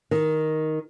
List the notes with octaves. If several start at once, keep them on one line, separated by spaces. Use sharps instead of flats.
D#3